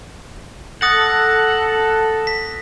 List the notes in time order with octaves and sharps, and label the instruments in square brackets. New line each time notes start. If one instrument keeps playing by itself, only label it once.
[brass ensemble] A4 [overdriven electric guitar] F#5 [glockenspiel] D#6 A6 A#6
[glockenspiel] B6